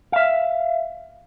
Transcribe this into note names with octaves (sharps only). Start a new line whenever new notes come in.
E5 F5